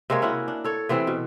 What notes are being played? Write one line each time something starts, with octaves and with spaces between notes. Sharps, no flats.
C3 G#3 A#3 C#5
C#4 E4 F#4
D4
A4 C#5
C3 E3 B3 C4
B2